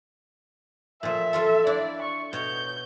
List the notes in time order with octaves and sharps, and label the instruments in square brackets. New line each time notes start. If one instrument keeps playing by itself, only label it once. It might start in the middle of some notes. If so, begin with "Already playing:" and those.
[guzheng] A#2 F3 [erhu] E5
[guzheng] F3 F4 A4
[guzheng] D4 E4 [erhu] D5
[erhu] C#6
[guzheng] B2 C#5 [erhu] G6